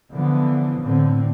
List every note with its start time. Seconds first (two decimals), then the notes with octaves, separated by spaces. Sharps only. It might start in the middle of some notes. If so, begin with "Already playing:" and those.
0.13 D3 E3 F3 B3
0.82 A2 D3 C4